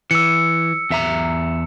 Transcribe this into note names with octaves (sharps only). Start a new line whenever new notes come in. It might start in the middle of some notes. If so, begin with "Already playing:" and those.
E3 E6 C#7
E2 E5 A#5